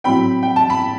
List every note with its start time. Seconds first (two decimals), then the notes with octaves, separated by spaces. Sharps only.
0.04 A2 F#3 C4 G5 B5
0.43 G5
0.56 A5
0.70 B5